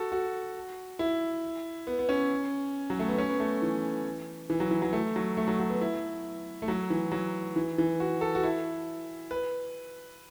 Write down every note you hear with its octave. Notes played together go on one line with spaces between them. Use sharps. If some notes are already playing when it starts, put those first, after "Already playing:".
Already playing: F#4 A4
F#4
E4
B3
B3
C#4
F#3
A3
B3
C#4
B3
A3
E3
E3
F#3
E3
F#3
A3
F#3
A3
F#3
F#3
B3
E4
A3
F#3
E3
F#3
E3
E3
F#4
A4
F#4
E4
B4